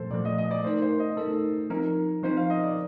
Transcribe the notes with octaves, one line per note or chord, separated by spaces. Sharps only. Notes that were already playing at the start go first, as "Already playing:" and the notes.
Already playing: A#2 F3 A3 A4 C5
A#2 F3 A3 D5
D#5
D#5
D5
A3 D#4 A#4 C5
C5
D#5
A3 D#4 A4 A#4
F3 C4 D#4 A#4
F3 C4 D#4 C5
F5
D#5
D5